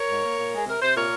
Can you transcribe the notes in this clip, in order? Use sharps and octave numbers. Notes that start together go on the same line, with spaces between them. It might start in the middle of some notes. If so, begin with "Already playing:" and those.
Already playing: A#4 C#5
G#2
A#3
A#2
G#3 G#4
C3 A#4
C3 C5
A#2 A#4 C#5